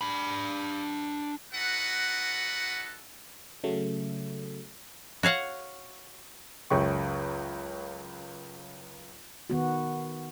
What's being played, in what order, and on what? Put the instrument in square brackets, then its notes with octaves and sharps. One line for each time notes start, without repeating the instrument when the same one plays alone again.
[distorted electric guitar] D4 B5
[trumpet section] D#4 F#4 A4 B4 F#5
[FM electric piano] C#3 F#3 A3
[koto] F#4 C#5 F5 F#5
[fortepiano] C#2 F#2 C#3 G5 C#6
[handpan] D#3 B3 F#4